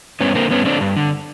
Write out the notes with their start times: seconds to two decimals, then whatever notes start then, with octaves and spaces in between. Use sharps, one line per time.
0.20 G2 B3 C#4
0.35 D3 A#3 C4
0.50 G2 B3 C#4
0.65 D3 C4 D4
0.81 G2
0.97 D3